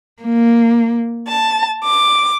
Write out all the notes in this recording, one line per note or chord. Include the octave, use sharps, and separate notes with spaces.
A#3
A5
D6